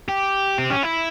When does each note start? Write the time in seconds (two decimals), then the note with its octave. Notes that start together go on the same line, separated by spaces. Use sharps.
0.08 G4
0.58 C4
0.70 C#4
0.83 E4